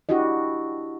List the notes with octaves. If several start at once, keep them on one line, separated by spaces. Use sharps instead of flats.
D4 E4 F#4 G4 D#5